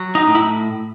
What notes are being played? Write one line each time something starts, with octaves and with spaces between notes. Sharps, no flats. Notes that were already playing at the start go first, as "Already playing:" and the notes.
Already playing: F#3
D#4
A2
E4